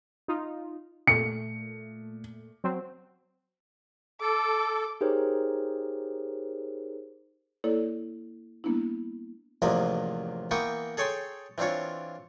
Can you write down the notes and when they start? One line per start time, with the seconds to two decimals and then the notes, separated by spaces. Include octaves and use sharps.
0.28 D#4 F4
1.07 A#2 A3 C#7
2.64 F#3 C4 C5
4.21 A4 D6
5.01 D#4 G4 G#4 A#4 C5 C#5
7.64 A#3 E4 A4 C#5 D5
8.64 G3 A#3 B3 D4 E4
9.62 A1 E2 C3 F3 A#3 D#5
10.51 E3 A#3 B3 G5 C#6 D#6
10.97 G#4 A4 C#5 G5 G#5 C6
11.58 E3 C4 D4 F4 C#5